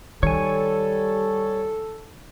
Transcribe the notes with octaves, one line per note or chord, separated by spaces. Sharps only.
D#3 G3 A4 C#5 G#5